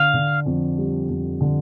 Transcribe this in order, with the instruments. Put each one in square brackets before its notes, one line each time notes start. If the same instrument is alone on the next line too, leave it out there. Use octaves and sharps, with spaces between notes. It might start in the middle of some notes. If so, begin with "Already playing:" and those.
Already playing: [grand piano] D3 [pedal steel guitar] F5
[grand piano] D3
F2
G3
F2
D3